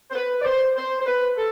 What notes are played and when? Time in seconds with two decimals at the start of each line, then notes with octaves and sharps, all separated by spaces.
0.11 C5
0.15 B4
0.41 D5
0.45 C5
0.76 C5
1.00 C5
1.06 B4
1.37 A4